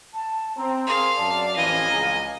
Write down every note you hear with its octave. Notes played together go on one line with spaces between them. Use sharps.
A5
C4 A#5
C4 G#4 A#4 F5 C6
F#2 D5 A5
A1 F2 E3 D#5 F5 G#5
C#2 G#4 A#5